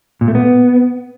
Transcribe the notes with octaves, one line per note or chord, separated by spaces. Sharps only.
A#2
A3
B3